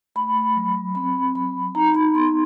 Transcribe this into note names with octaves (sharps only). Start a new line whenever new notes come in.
A3 B5
F#3
C4 B5
F#3 B5
D#4 A#5
B5
B3 C6